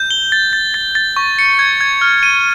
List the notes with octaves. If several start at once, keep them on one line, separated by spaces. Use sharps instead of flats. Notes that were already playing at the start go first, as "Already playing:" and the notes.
Already playing: G6
G7
A6
A6
A6
A6
C#6
C#7
G#6
G#6
F6
D#7